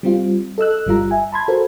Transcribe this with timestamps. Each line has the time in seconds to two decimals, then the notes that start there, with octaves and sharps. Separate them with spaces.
0.03 G3 C4 F4
0.58 A4 D#5 E6 F#6
0.86 G1 G3 F4 A#5
1.11 E5 G#5
1.33 A5 B5 C6 G#6
1.48 F#4 A4 A#4 C5